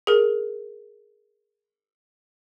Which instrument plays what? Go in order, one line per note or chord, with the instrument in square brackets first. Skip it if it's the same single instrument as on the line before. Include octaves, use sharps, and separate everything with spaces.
[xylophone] G#4 A#4